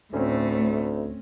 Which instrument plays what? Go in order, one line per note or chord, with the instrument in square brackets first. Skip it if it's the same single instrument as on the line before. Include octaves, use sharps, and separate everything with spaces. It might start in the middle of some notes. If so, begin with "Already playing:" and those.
[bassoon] D2 [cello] A2 A3 [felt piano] C4 C#4